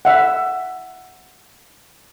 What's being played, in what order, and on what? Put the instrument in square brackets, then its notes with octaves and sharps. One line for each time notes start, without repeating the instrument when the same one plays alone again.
[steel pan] E5 F#5